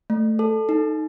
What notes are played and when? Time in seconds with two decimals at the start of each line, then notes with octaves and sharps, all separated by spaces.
0.10 A3
0.39 A4
0.69 D#4